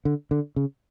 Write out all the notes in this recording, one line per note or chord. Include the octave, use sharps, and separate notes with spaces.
D3
D3
C#3